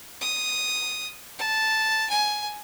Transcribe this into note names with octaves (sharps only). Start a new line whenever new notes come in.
D#6
A5
G#5